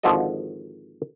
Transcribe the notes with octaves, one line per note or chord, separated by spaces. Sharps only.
G#1 D3 F3 F#4 A4 D#5